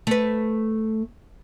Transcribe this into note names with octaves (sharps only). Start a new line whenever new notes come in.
A3 B4